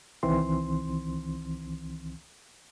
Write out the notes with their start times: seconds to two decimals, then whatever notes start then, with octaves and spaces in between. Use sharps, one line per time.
0.23 C2 D#3 E3 C4 C6